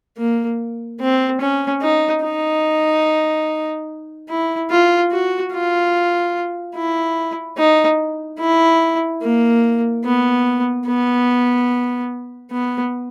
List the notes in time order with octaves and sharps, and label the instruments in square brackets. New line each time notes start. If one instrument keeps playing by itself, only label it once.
[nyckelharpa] A#3
C4
C#4
D#4
D#4
E4
F4
F#4
F4
E4
D#4
E4
A#3
B3
B3
B3